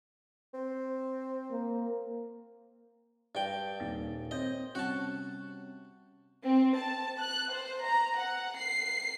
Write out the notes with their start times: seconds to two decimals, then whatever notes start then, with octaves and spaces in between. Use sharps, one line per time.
0.54 C4
1.51 A#3
3.35 G2 D5 G5
3.80 D#1 D#3 A6
4.31 C4 C#5 D#5 G6
4.75 C3 G3 C#4 F#4 A5
6.46 C4
6.76 A5
7.20 F#6
7.51 C5
7.85 A#5
8.19 F#5
8.59 C7